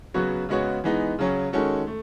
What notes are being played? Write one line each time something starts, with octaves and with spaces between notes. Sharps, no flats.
C#3 F#3 B3 F#4 C#5
C#3 G#3 B3 F#4 C#5
E3 G#3 B3 D#4
C#3 F#3 C#4
D#3 G#3 C#4 F#4 A4
A3